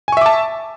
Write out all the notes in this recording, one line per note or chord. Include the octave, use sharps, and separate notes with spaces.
E5 G#5 A5 C#6 D6